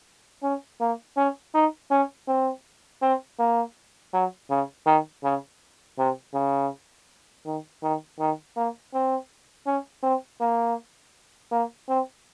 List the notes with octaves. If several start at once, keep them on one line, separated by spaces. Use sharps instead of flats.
C#4
A#3
C#4
D#4
C#4
C4
C4
A#3
F#3
C#3
D#3
C#3
C3
C#3
D#3
D#3
D#3
A#3
C4
C#4
C4
A#3
A#3
C4